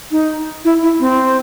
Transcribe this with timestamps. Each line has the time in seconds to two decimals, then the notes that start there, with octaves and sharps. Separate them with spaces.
0.11 D#4
0.65 E4
0.83 E4
1.00 C4